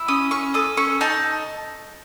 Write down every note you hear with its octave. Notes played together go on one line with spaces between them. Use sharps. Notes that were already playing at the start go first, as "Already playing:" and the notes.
Already playing: E4
C#4 D#6
C#4 C#6
A4 D#6
C#4 C#6
D#4 A5